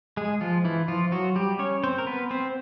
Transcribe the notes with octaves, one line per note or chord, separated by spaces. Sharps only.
G#3 G#4
F3 F4
E3 E4
F3 F4
F#3 F#4
G3 G4
C#4 C#5
C4 C5
A#4
B3 B4
C4 C5